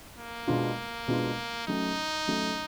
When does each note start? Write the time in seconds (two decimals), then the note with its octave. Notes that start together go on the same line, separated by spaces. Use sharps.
0.17 A#3
0.47 B2 G#3 B3 D4 F4
1.08 B2 G#3 B3 D4 F4
1.67 F#3 A3 C#4 D#4
2.28 F#3 A3 C#4